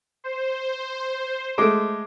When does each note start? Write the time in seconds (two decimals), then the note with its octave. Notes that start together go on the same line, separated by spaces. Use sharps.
0.24 C5
1.58 G#3 A3 D6 D7